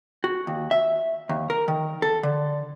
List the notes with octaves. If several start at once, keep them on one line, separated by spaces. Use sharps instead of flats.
F#4
D#2
E5
D#2
A#4
D#3
A4
D3